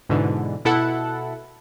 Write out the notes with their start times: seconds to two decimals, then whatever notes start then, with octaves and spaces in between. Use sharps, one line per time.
0.09 G#2 B2 D3 E3
0.65 B2 E4 A4 F#5